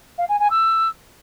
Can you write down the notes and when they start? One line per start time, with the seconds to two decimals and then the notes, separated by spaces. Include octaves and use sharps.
0.18 F5
0.29 G#5
0.40 G#5
0.50 E6